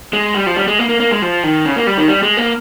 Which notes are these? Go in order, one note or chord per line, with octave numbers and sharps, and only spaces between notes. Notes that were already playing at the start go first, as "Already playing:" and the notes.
G#3
G3
F3
G3
G#3
A#3
A#3
A#3
G#3
F3
D#3
C#3
A#3
G3
D#3
G3
G#3
A#3